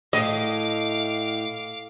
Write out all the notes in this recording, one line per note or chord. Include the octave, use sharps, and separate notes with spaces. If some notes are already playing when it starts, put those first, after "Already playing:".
A2 D#5 F5 D6